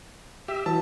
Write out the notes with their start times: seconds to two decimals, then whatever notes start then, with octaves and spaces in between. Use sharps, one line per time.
0.48 G4 E5
0.66 E3 F#3 A5